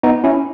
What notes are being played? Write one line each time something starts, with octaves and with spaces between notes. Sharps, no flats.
B3 D#4
C#4 E4